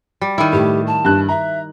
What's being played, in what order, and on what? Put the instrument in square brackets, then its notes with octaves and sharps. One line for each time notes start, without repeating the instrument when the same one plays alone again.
[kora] G3
D#3 E4
[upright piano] A2 [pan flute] G4
[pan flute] A5
[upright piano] G2 F#6
[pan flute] E5 [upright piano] A#5